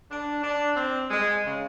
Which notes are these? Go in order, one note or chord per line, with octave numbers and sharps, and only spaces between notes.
D4
D4
C4
G#3
C#3